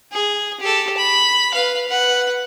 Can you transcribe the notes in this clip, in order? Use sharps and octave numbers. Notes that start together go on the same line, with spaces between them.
G#4
G4 A4
B5
B4 F5
B4 F#5